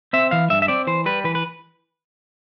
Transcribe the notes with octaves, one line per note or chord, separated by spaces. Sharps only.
C4 E5
E3 F5
G2 E5
E5
C4 D5
E3 C5
G3 B4
E3 B4
B4